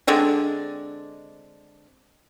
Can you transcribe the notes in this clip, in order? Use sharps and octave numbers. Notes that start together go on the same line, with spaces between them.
D3 G#3 C4 D4